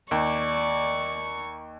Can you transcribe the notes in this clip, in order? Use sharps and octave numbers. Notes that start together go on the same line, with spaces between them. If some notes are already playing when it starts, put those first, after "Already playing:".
D#2 D5 C#6